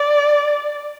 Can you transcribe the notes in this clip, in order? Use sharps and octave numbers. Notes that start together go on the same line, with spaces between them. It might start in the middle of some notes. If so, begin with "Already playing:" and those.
Already playing: D5